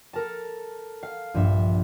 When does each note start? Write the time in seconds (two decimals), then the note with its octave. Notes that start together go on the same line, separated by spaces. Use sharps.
0.13 A4 A#4 A5
1.03 F5
1.34 A#1 G2 E5